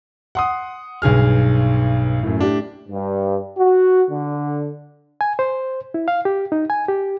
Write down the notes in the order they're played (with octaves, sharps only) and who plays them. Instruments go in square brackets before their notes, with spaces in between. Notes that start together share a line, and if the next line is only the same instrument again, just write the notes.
[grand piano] F#5 C6 D#6
B1 G2 G#4 F6
F#2 A2
A2 D4 G4
[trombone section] G2
F#4
D3
[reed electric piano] G#5
C5
E4
F5
G4
D#4
G#5
G4